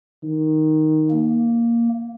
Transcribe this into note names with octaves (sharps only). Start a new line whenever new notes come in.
D#3
A#3